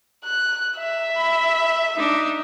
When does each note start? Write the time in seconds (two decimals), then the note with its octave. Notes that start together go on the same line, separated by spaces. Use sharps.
0.25 F#6
0.77 E5
1.16 B5
1.96 D4 D#4